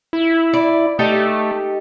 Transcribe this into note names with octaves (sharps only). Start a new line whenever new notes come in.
E4
D5
A3 D#4 G4 A4